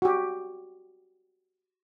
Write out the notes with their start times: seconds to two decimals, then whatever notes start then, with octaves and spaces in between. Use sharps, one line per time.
0.02 F#4 G4